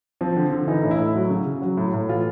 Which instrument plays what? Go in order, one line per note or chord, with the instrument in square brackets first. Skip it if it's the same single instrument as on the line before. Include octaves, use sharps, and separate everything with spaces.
[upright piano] F3 C4
D3
D3
E3 D#4
A2
E4
A2
F#3
C#3
C#3
F#3
A2
A2
E3 F4